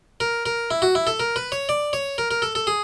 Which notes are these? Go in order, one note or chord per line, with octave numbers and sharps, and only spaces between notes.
A#4
A#4
E4
F#4
E4
A4
A#4
B4
C#5
D5
C#5
A#4
A#4
A4
A4
G#4